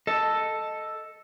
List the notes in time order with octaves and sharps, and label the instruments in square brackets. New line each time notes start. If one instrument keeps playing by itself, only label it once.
[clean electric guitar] A4 D#5